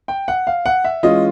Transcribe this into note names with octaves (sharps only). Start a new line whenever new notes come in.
G5
F#5
F5
F#5
E5
E3 G#3 C#4 F4 D#5